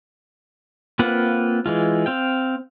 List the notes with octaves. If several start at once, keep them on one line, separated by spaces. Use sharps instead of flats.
A#3 C4 F4 B4 F#5
E3 G#3 F4
C4 F5 G5